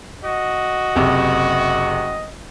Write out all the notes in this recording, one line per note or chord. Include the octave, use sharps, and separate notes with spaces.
F#4 D#5
F#1 C3